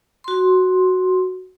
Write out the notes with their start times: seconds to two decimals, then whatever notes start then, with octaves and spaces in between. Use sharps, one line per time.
0.24 F#4 C6